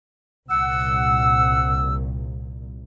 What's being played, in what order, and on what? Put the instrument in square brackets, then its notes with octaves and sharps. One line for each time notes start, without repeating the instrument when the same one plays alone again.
[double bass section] C2 A#2 [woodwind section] F#5 E6